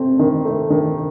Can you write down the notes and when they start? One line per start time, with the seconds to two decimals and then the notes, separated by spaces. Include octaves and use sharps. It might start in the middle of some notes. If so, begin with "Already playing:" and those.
Already playing: A3 C4
0.19 D#3
0.45 A3
0.70 D#3